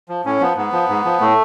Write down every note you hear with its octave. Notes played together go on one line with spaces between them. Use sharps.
F3
A2 C#4
F3 B3
G#2 B3
F3
G#2
F3
A2 A3